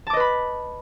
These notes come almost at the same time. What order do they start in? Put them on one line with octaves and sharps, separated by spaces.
A5 D6 D#5 B4 B5